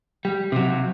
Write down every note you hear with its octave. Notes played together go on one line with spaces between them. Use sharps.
G3
C3 F#3